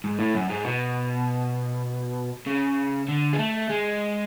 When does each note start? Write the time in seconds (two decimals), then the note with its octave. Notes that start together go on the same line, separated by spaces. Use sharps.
0.04 G#2
0.19 A2
0.34 F#2
0.49 G#2
0.65 B2
2.47 C#3
3.09 D3
3.33 G#3
3.39 A3
3.69 G#3